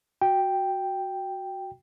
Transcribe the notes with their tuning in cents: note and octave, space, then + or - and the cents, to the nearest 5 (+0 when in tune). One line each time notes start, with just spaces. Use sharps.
F#4 +0 G5 +0